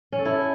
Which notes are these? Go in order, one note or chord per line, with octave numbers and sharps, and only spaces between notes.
C#4
A4
E4